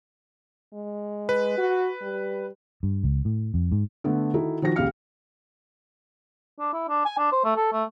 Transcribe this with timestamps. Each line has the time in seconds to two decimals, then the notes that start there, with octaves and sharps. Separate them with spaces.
0.73 G#3
1.29 B4
1.58 F#4
2.02 G3
2.83 G2
3.04 C#2
3.25 A2
3.54 F2
3.72 G#2
4.04 D3 A3 B3
4.34 D#3 D#4 E4 F#4 A4
4.62 D#3 F3 F#4 A#6
4.76 D#1 C#2 G4 F5 F6 C#7
6.60 D4
6.73 E4
6.88 D4
7.05 G#5
7.18 D4
7.32 C5
7.44 A3
7.56 A4
7.72 A3